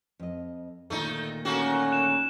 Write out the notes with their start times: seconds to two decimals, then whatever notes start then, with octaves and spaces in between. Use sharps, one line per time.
0.20 F2 D#5
0.90 D2 A#2 D#3 A3 D#4
1.45 A3 A#3 C#4 F#4
1.92 F#6 E7